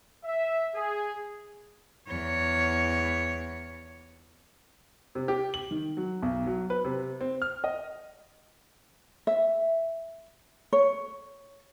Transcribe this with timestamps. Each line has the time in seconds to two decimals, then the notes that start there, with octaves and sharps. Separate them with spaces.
0.25 E5
0.75 G#4
2.07 E2 C#5
5.15 C3
5.28 G4
5.54 F#7
5.71 D#3
5.97 F#3
6.22 B1
6.47 F#3
6.70 B4
6.84 C3
7.21 C4
7.42 F6
7.64 D#5
9.27 E5
10.73 C#5